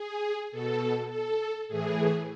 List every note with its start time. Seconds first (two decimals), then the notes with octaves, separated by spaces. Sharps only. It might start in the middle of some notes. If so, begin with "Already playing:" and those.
Already playing: G#4
0.52 B2 A4
1.10 A4
1.68 A2 E3 G#4